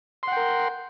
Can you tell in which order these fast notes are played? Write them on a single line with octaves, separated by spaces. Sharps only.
C6 F#5 G5 A#4